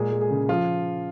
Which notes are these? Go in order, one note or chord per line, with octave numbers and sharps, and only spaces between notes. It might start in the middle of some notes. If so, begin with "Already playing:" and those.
Already playing: A#2 G#3 G#4
G#3
G#4
C#3
F3 F4